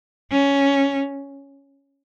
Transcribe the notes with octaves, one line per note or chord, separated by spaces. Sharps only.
C#4